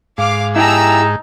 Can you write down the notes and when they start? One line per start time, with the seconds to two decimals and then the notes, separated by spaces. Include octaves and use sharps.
0.18 G#2 F5 D6
0.56 D#4 E4 G4 G#4 A5 A#5 E6